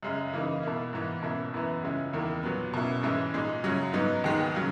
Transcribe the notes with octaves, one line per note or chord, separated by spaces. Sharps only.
F#2 C#3 G#3
C#3 E3 A#3 D#4
B2 A#3 E4
G#2 E3 B3
B2 A#3 C#4 E4
F#2 E3 B3 E4
C#2 C#3 G#3 C#4 E4
E2 D#3 A#3 E4
A#2 F#3 B3
B2 A#3 C#4 E4
G#2 E3 G#3 C#4 E4
A#2 G#3 D#4
F#2 C#3 F#3 C#4
G#2 F#3 B3 D#4
D#2 D#3 G#3 B3 D#4
C#3 F#3